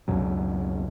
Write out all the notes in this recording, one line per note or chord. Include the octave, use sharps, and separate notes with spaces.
C#2 F#2 B2 F#3